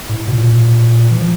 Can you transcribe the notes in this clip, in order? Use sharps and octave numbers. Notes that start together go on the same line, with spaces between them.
A2
B2
A#2
E3
F3